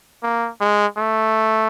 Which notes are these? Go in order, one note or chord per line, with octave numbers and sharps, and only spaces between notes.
A#3
G#3
A3